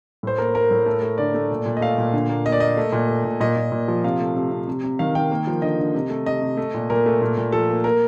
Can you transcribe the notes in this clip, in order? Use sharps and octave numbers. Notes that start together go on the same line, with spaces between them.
A2 C5
A#3 A#4
A#3 A#4
A2
A3
A3
D3 D5
A3
A#2
A#2
D#5
A3 F5
A#2
D3
A#3
A#3 D#5
D5
A#3 D#5
A3
A#2
A3
A#2
A#2 D#5
A#2
A#2
F3
C3 F5
A3
C3
C3
C3
C3
D#3 F5
D#3 G5
A#3
F3
D3 D#5
D3
C3
A3
C3 D#5
C3
A3
A#2
A#2 A#4
A3
A#2
A#2
F3 A4
A#3
A#3 A#4